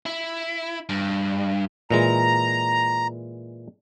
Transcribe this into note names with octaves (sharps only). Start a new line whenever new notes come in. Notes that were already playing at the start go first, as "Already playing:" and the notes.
E4
G2
A#2 E3 G#3 A#5